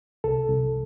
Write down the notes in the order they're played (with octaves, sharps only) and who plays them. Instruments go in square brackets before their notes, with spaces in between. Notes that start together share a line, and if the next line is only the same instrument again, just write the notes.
[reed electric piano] C2 A4
C2